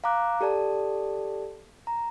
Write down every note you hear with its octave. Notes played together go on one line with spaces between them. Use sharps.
F5 A#5 D6 F#6
G4 A4 D5 A5
A#5